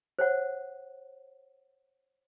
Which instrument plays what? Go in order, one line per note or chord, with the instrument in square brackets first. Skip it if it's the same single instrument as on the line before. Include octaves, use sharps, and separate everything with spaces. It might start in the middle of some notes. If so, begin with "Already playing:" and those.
[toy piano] C5 C#5 F#5